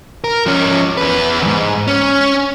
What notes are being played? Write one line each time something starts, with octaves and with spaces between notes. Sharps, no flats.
A#4
F3 C#4
E2 B4
E2 G#2
C#4